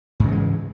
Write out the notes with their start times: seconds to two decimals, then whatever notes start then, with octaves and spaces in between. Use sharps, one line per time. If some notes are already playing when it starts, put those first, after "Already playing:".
0.20 G#2
0.24 C#3
0.28 E3
0.32 G#3